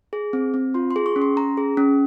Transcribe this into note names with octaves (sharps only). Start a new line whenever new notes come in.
G#4
C4
C4
F4 C6
C6
G#4
C#6
C#4
C6
C#4 A#5
G#4
C#4